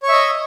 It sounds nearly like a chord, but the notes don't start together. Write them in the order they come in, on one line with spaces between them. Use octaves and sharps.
C#5 C#6 E5 D#5